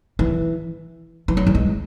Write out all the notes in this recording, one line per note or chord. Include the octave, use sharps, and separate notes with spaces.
E3
E3
F#3
E3
G#3